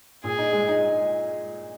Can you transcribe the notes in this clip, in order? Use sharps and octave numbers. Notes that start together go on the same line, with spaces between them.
A#2 G#4
D#4
G#3
D#4